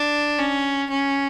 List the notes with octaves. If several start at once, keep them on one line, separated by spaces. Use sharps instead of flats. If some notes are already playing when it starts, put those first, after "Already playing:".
Already playing: D4
C#4
C#4